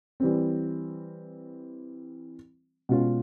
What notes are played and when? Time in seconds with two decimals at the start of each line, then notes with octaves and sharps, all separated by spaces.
0.20 E3 G3 C4
2.89 B2 G#3 C#4 F4